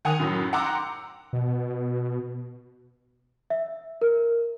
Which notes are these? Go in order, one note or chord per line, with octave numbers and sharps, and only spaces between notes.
D#3 F#5 G#5 D#6 F7
F#2 A2 F#3
F#5 G5 A#5 C6 D6 E6
B2
E5
A#4